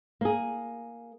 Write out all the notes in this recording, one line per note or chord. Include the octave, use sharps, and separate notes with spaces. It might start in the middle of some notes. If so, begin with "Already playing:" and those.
A#3 G#4